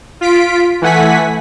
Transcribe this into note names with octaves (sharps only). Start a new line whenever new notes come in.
F4 B6 D7
E3 A3 F#5 G#5 B6